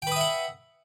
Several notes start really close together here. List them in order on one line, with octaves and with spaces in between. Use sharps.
G5 B4 D#6 E5 F#5